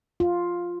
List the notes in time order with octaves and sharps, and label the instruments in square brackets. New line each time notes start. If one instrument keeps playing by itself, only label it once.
[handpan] F4